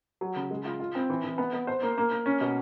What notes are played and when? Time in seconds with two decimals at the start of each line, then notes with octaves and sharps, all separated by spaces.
0.21 F#3
0.36 C#3
0.51 G#3
0.65 F4
0.80 F4
0.95 C4
1.10 E3
1.24 E3
1.38 B3
1.53 B3
1.67 C5
1.82 A#3
1.98 A#3
2.12 A#3
2.26 C#4
2.41 B2